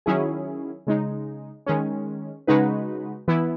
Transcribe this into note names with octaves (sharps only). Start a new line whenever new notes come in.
D#3 F#3 C#4 E4 G#4
C#3 G#3 D#4
D#3 G#3 C#4
C#3 G#3 D#4 F#4 B4
E3 B3 E4